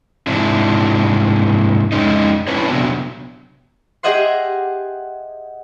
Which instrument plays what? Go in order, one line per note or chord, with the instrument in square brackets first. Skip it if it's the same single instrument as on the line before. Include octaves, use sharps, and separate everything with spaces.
[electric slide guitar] G#2 C3 D4 E4
F2 G#3 C#4 D#4
C#4 D4 E4 B4 C#5
C3 F#3 B3 D4
[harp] G4 G#4 D#5 E5 F#5 C6